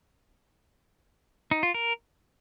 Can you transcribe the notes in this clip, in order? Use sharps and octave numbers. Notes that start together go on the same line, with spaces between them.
D#4
F4
A#4